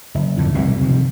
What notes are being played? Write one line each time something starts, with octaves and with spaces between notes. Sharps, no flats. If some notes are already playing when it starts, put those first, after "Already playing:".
F#1
F2 A2 D3
F1 C2 G#2 B2
C3 D#3 F3